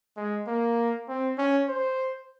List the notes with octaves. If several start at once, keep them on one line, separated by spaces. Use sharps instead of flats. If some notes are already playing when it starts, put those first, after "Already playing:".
G#3
A#3
C4
C#4
C5